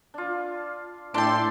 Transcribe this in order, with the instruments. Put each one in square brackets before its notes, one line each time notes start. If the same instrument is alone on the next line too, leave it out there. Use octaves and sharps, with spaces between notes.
[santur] D4 F4
[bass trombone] A2 [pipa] D4 A4 [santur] D5 E5 G5 [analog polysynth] C6